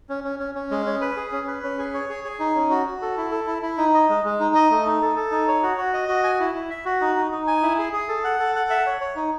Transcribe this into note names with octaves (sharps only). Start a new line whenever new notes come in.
C#4
C#4
C#4
C#4
G#3
C#4
B4
G#4
C#4
B4
C#4
G#4
C#5
G#4
G#4
D#4
C#4
F#4
F#4
A4
E4
A4
E4
E4
D#4
D#5
G#3
G#3
D#4
D#5
A3
D#4
A4
A4
D#4
C#5
F#4
F#4
D#5
F#4
G#5
E4
E4
E5
F#4
D#4
D#4
D#4
G#5
E4
G#4
G#4
A4
F#5
A4
F#5
E5
C#5
C#5
D#4